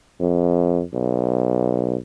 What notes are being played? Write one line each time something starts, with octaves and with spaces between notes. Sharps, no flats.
F2
B1